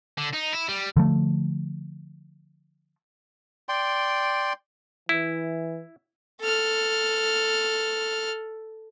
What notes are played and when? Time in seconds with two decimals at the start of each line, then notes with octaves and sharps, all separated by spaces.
0.18 D3
0.33 D#4
0.53 E4
0.68 G3
0.97 D3 F3 A3
3.69 D5 G5 C6
5.09 E3 E4
6.41 A4 F6